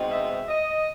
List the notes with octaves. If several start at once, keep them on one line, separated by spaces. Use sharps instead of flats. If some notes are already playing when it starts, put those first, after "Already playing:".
Already playing: B2 G#3 C4 D#4
E5
D#5